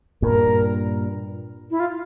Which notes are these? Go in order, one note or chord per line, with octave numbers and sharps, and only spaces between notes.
G2 A#2 A#4
E4
F4